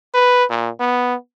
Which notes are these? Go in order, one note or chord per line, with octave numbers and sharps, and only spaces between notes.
B4
A#2
B3